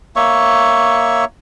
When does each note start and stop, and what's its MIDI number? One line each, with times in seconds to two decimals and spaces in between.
0.16 1.25 58
0.16 1.25 73
0.16 1.25 76
0.16 1.25 85